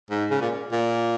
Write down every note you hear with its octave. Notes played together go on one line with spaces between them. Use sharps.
G#2
C#3
A#2
A#2